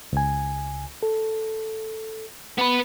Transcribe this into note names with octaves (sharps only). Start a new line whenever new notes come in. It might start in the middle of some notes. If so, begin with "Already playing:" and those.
C#2 G#5
A4
B3 B4